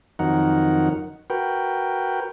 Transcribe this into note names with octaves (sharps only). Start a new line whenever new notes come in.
F2 D#3 F#3 D#4 A#4 F#5
F#4 A#4 B4 G5